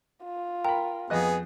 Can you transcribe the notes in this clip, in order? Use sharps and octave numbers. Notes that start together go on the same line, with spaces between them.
F4
A#4 G5 A#5 B5
F2 B3 G#4 D#5 F#6